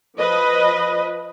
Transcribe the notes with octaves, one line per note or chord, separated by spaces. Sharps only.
F3 B4 D#5